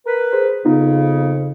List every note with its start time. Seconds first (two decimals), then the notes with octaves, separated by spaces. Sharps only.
0.06 A#4 B4
0.32 G#4 C5
0.65 F2 C#3 B3 D#4 F4